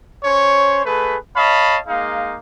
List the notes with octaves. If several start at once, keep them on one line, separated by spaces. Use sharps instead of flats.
C#4 C5 C#5
A3 G#4 B4
C#5 D#5 F5 A5 B5
G#3 A#3 D#4 F5